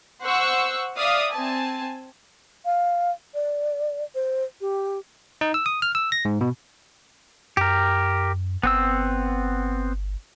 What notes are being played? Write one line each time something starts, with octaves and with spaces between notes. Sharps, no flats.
C5 F#5 C#6 E6
D5 E5 F5 D#6
C4 G#5 A5
F5
D5
C5
G4
D#4
E6
D#6
F6
E6
A#6
G#2
B2
F#2 G4 A#4
G1 B3 C4 E6